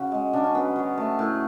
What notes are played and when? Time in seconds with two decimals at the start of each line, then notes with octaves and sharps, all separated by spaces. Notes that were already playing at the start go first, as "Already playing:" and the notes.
Already playing: C#3 F#4
0.12 G#3
0.33 C#3 D4
0.44 C#4
0.54 F#3 B3
0.76 F#3
0.98 A3
1.19 A2